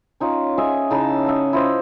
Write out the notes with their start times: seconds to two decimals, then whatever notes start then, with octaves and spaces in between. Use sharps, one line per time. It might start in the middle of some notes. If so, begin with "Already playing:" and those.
0.20 C#4 D#4 F4
0.58 G#4 D#5 E5 G#5
0.90 C#3 D#4 E4 A5
1.26 D#5 E5 F#5 A5
1.53 E4 F4 C5 D#5